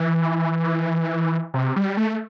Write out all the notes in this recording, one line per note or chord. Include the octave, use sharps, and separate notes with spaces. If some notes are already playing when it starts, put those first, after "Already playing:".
Already playing: E3
C3
G3
A3